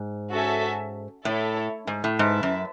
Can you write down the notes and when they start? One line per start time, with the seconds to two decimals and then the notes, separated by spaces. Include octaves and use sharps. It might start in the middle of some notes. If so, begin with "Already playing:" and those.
Already playing: G#2
0.32 C#4 F#4 A4 E5 G#5
1.25 A2 E4 A4 C#5
1.87 G#2
2.04 A2
2.19 G#2 E4 B4 E5 A5
2.43 F#2